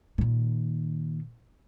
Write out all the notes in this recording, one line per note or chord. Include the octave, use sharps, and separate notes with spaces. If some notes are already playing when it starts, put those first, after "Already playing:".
A#2 D#3